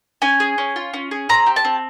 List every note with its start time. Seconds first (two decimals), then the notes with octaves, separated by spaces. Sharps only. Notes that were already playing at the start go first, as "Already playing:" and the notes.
0.22 C#4 G#5
0.40 G#4
0.58 C#4
0.76 F4
0.94 C#4
1.11 G#4
1.29 C4 A#5
1.46 G4
1.56 A5
1.65 C4